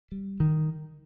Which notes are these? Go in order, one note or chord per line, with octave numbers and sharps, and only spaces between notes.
G3
D#3